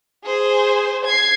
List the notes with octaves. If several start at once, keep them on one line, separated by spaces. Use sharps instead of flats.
G#4 C5
G#6 C7